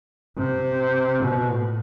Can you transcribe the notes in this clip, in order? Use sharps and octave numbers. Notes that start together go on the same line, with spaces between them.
C3
B2
A2